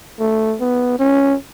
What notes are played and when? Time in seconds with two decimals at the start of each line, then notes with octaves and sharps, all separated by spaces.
0.19 A3
0.60 B3
0.99 C#4